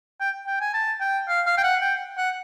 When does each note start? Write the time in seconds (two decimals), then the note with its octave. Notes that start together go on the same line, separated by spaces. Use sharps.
0.20 G5
0.47 G5
0.61 G#5
0.73 A5
1.00 G5
1.28 F5
1.46 F5
1.58 G5
1.63 F#5
1.81 G5
2.17 F#5